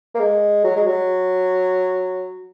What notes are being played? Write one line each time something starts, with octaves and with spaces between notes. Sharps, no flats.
A#3
G#3
F#3
G#3
F#3